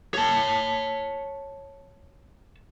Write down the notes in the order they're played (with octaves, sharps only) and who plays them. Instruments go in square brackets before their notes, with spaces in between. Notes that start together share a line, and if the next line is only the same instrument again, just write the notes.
[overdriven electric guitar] C#5 A5